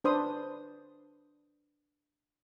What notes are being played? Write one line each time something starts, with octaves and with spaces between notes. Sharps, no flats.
D4 B4 C5 C6 D#6